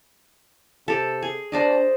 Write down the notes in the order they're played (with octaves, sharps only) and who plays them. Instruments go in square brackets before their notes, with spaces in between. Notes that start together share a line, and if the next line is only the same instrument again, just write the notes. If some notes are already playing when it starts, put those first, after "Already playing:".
[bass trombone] C3 [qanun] G4 A4
[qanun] G#4
[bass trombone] D4 [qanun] C5 D5 D#5